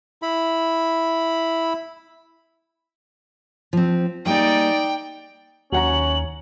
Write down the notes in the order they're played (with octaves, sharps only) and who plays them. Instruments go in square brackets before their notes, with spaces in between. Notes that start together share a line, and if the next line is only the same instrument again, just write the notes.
[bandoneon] E4 B5
[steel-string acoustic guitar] F3 C4
[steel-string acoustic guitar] G3 A#3 G#4 [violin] D#4 D5 [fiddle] G5
[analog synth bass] D#2 [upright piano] F#3 F#5 A#5 [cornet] C#4 [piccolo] F#7